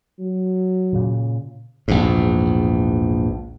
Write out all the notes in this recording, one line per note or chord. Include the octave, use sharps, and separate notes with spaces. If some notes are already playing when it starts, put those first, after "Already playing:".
F#3
A#2 C#3
A#1 E2 G#2